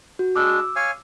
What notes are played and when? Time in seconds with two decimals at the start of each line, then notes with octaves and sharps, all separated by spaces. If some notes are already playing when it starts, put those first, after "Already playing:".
0.19 F#4
0.36 G#3 D4 D6 E6
0.76 C#5 F5 G#5